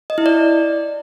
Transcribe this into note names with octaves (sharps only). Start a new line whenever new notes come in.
D#5
E4
D5